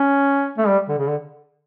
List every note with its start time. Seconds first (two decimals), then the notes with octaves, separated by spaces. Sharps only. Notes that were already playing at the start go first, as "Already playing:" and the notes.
Already playing: C#4
0.58 A3
0.68 G3
0.88 D3
0.98 C#3
1.08 D3